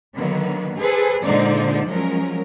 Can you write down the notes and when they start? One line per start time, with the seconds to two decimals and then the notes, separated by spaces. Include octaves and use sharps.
0.16 D3 D#3 F#3 A#3 B3
0.76 G#4 A4 B4 C5
1.23 A#2 D3 G#3 D#4 C5 D5
1.85 F3 F#3 G#3 C#4 A#4